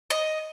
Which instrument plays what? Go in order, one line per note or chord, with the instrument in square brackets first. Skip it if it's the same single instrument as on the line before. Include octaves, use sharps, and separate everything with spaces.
[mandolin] D#5